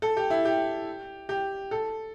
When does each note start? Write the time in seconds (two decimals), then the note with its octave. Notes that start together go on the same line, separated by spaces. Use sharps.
0.02 A4
0.17 G4
0.30 E4
0.45 G4
1.29 G4
1.71 A4